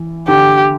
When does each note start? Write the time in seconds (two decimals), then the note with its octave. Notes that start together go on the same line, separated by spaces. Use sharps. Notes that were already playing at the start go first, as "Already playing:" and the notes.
Already playing: E3
0.28 D3 G4